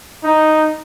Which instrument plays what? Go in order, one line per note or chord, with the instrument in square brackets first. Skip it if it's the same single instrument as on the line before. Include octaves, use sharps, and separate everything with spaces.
[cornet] D#4